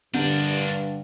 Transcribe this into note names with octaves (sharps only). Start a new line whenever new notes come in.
G2 D3 D4 A#4 G6